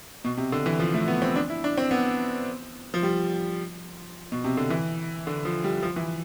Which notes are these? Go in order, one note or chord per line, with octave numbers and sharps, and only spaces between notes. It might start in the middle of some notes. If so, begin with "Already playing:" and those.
B2
C3
D3
E3
F3
A3
B3
C4
D4
E4
D4
C4
B3
F3
G3
B2
C3
D3
E3
D3
F3
G3
F3
E3